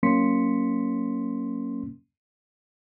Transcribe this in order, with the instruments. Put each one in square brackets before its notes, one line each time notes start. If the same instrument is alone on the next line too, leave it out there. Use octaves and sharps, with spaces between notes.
[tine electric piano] F#3 A#3 C#4 C6 B6 C#7